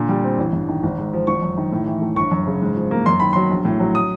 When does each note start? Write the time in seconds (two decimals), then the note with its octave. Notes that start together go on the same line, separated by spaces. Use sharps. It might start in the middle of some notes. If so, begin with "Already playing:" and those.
Already playing: A#2 D3
0.09 G3
0.24 C4
0.38 A1
0.53 G2
0.68 D#3
0.83 G#1
0.98 G#2
1.13 F3
1.27 G#1 C#6
1.42 F#2
1.57 D#3
1.72 A2
1.86 E3
2.01 A3
2.16 G1 C#6
2.31 F#2
2.47 C#3
2.62 G#2
2.76 F3
2.91 A#3
3.06 F#2 C6
3.20 D#3 B5
3.33 F#3 C6
3.51 A#1
3.65 A2
3.80 F#3
3.95 D#6